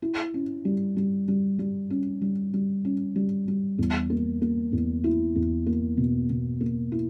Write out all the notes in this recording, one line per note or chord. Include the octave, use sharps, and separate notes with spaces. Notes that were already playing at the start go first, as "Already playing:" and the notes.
E4
C#4
G3
G3
G3
G3
C#4
G3
G3
C#4
G3
G3
E2
A#3
A#3
E2
E4
E2
A#3
B2
B2
A#3
E4